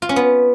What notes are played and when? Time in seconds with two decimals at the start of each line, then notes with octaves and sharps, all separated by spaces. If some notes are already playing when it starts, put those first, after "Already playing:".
0.02 F4
0.09 C#4
0.16 B3